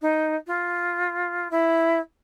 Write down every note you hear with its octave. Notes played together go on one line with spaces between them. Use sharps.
D#4
F4
E4